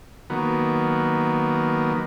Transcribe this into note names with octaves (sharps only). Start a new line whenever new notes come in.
D#3 F#3 A#3 B3